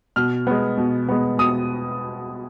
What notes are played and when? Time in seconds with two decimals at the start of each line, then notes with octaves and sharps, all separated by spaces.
0.16 B2 F6
0.47 G#3 B3
0.78 B2
1.09 G#3 B3
1.39 B2 D#6